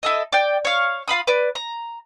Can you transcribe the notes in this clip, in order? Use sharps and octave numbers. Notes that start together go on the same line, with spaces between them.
E4 A4 D#5
D5 G5
C#5 F5
F4 F5 B5 D#6
B4 D5
A#5